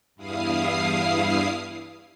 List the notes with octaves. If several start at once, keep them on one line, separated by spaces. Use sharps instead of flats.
E2 G2 E4 F5 D#6 C7